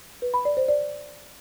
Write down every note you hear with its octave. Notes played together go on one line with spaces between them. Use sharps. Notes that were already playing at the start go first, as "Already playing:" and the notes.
B4
B5
D5
C5
D5